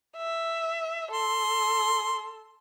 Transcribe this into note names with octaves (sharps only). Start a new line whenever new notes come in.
E5
A4 C6